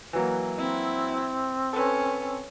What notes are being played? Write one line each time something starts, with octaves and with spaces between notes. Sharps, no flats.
E3 F#3 A#3
C4 E4
C#4 A4 B4